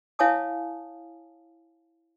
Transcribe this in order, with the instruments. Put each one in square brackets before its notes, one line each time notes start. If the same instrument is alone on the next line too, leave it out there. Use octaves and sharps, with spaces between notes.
[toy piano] E4 C#5 F5 G#5 A5 D#6